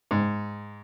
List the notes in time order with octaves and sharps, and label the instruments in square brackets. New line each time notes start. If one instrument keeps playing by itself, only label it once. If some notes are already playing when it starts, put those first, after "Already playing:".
[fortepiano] G#2